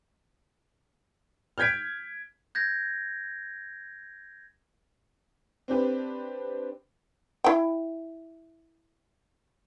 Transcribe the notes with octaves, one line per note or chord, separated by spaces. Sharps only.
F6 G6 G#6 B6 D7
G6 G#6 A#6
C4 D4 G4 B4
E4 G5